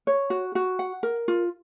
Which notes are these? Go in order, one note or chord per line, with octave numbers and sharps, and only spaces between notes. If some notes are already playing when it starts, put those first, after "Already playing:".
C#5
F#4
F#4
F#5
A#4
F4